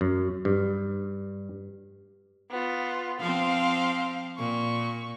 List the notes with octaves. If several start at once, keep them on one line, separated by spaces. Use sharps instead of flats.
F#2
G2
B3 F4
F3 C4 F5
A#2 C#6